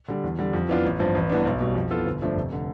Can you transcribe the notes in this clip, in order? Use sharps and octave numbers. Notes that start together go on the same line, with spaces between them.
D3 G3
E2
D3 G3
F2
E3 B3 D4 F4
A1
G2 F3 C4
A1
G2 E3 B3 D4
B1
B2 G3
F2
E3 B3 F4 A4
G1
G2 F3 A3 D4
F1
D3